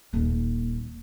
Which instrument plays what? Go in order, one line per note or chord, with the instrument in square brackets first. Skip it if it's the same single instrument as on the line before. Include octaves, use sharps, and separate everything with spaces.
[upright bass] D#1 A#3